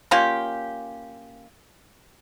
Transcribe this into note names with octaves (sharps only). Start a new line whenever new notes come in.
A#3 C#4 F4 G4